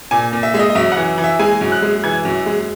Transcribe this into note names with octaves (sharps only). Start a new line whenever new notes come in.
A#2 G#5
A#2
E5
G#3 E5
D#5
D#5
F#2 E5
F#5
E3
E3
E5
G#3 G#5
F#2
F#6
G#3
E3 G#6
F#2
G#3